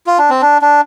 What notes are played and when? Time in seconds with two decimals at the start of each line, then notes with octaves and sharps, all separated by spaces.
0.07 F4
0.18 D4
0.30 C4
0.42 D4
0.62 D4